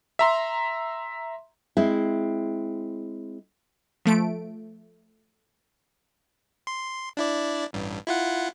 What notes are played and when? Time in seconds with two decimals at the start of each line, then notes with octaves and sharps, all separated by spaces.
0.19 E5 A#5 C6
1.77 G#3 C4 E4
4.05 F3 A3 D7
6.67 C6
7.17 D4 E4 D5
7.73 A1 G2
8.07 E4 F4 F#5